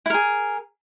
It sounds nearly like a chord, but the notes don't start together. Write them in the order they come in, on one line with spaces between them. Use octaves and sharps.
E4 A#4 G#4